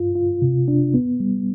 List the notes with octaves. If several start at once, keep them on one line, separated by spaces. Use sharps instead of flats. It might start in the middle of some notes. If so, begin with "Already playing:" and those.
Already playing: G2 F4
F4
C3
D4
B3
G3